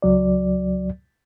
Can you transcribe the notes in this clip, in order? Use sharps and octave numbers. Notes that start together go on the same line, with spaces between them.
C#2 F#3 D5